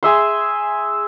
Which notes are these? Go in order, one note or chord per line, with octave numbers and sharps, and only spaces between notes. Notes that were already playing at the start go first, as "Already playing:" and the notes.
G#4 E5 C6